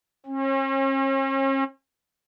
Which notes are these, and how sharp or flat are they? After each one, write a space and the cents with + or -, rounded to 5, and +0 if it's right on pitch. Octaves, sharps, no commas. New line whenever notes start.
C#4 -45